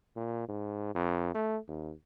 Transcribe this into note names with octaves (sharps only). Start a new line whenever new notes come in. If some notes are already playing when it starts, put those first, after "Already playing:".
A#2
G#2
F2
A3
D#2